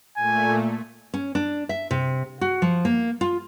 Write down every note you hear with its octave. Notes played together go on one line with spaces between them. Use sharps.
A#2 A3 G#5
C#4
D4
E5
C3
F#4
F3
A#3
F4